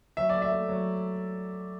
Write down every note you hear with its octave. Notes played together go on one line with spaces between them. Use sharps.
F#3 E5
A3 D5
E5
A3
F#3